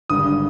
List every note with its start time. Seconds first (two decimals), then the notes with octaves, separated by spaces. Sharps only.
0.09 G#1 G2 D3 D#6